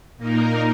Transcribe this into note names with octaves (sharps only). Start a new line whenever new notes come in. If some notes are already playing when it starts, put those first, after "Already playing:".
A#2 A#3 D#4 A#4